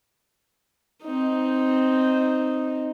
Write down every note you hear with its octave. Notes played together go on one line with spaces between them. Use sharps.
C4 D#4